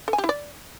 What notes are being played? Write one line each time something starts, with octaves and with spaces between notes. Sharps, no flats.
A4
G#5
G4
E4
D5